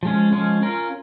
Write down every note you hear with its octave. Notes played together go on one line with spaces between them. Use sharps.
F3 G#3 C#4
F3 G#3 C#4
C#4 F4 A#4